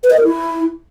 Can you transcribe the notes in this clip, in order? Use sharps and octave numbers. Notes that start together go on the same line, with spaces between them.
B4
D#5
A#4
E4